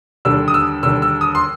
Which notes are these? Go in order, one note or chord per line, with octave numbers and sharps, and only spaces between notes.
D#2 D3 G3 E6
D#6
E6
D#2 D3 G3 E6
E6
D#6
C6